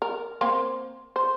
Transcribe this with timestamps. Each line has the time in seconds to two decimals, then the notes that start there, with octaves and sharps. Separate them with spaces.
0.02 A#4
0.41 A#3 C4 C5
1.16 C5